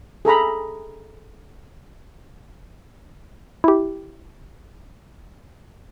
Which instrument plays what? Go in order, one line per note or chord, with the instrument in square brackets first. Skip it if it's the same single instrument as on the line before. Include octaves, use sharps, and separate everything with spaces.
[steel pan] G#4 A4 A#5 B5
[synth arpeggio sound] E4 G4